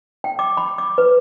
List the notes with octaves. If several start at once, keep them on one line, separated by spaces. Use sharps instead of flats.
G5
D6
B5
D6
B4